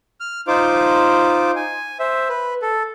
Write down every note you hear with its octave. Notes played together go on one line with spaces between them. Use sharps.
F6
D#4 F4 C5 D6
G#5
C5 E5
B4
A4